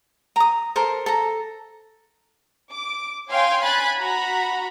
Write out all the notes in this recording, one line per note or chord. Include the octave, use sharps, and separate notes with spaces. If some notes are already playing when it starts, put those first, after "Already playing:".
A#5 D#6
A4 A#4 C5
A4 A#5
D6
C#5 F5 G5 G#5 C6
G#5 B5 F#6 A6
F#4 F#5 A#5 B5